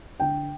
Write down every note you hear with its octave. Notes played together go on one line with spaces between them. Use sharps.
D3 G5